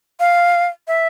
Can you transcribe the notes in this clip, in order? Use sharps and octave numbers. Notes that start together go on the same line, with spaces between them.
F5
E5